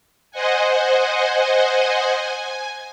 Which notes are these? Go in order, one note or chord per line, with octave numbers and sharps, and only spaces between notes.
C5 D#5 F#5 G#5
G#5